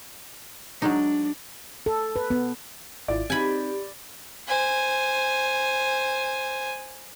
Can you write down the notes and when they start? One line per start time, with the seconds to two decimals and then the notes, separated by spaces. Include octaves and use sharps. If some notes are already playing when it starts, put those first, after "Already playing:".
0.82 F#3 G#3 D4 D#4
1.86 A4
2.16 B4
2.30 B3
3.08 G#1 E4 F4 D5
3.30 C4 D#4 G4 G#5 B5
4.47 C5 G#5